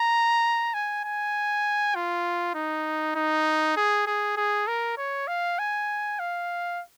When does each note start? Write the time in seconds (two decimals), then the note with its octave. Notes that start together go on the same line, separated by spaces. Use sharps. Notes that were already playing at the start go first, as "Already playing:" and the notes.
Already playing: A#5
0.74 G#5
1.04 G#5
1.95 F4
2.55 D#4
3.15 D#4
3.77 G#4
4.07 G#4
4.37 G#4
4.68 A#4
4.97 C#5
5.27 F5
5.59 G#5
6.19 F5